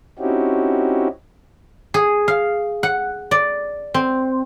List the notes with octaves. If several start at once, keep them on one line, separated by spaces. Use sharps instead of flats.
C4 C#4 D#4 E4 F#4 G4
G#4
F5
F#5
D5
C4